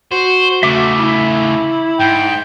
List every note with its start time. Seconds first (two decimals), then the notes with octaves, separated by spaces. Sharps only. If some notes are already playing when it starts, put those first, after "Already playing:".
0.12 F#4 C5
0.63 C#3 A3 E5 D6
0.98 E4
2.00 G#2 G5